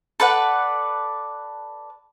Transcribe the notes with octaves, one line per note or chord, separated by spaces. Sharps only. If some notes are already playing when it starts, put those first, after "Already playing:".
A4 B4 D5 F#5